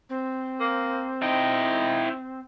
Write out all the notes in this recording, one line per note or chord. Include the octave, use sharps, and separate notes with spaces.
C4
A#3
D#4 E4 G5